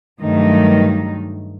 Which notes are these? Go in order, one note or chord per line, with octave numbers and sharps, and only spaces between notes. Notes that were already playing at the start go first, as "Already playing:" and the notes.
G2 D#3 F#3 A3 D#4